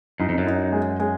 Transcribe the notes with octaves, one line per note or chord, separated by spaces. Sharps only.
F#2 D#4
F2
F#2
D#4
G#3
G#3